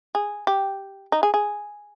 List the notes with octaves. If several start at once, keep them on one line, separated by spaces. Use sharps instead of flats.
G#4
G4
D#4
G#4
G#4